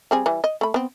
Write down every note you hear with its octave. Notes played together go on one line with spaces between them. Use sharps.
G3 C4 G#4
E3 G3
D#5
A3 B5
B3 C4